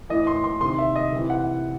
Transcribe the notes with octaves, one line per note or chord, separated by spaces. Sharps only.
A2 E3 D#5
C6
C6
C3 D#3 C6
E5
D#5
C3 E3
F#5